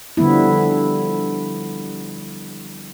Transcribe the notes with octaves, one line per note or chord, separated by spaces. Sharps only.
D3 F3 G3 B3 E4